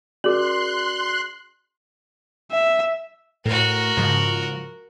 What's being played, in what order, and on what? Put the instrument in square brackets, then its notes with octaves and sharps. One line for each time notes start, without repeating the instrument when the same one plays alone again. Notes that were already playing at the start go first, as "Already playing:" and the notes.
[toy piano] C#4 G#4 A#4 [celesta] F#4 D5 F#7 [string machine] C6 F#6
[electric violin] E5
[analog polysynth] A2 [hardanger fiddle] F#4 A#4
[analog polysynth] G#2 C#3 F3